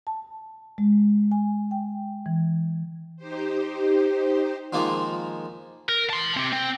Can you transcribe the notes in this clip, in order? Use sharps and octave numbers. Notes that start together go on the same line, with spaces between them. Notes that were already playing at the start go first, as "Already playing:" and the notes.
A5
G#3
G#5
G5
E3
D#4 G4 C5
D#3 F3 G#3 A#3 D#4 F4
A#4
A5 C6
C4 G4
C4